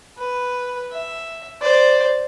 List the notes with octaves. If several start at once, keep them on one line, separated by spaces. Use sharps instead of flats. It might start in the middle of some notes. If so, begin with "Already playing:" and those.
B4
E5
C5 D5